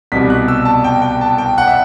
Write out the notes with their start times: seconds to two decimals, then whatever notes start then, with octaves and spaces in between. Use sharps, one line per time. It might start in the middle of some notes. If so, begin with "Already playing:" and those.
0.12 C2 B2 G3 B6
0.30 F#6
0.48 E6
0.65 A5
0.84 G5
1.02 G5
1.21 A5
1.38 G5
1.58 F#5
1.67 E5